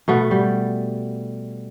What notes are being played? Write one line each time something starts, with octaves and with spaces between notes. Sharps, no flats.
B2 A3 B3
G3